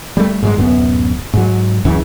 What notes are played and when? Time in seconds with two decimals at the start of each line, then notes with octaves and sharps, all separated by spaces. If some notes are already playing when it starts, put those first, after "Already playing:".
0.17 G3 A3
0.43 G#2 F#3 G#3
0.57 D1 F#2 A3 B3
1.34 G#2 F#3
1.85 C#2 F#2 C#3 E3